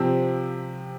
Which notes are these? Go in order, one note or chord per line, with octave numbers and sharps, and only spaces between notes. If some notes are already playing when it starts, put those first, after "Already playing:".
Already playing: C3 F3 C4